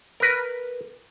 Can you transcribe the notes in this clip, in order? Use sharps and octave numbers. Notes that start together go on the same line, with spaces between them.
A#4 B4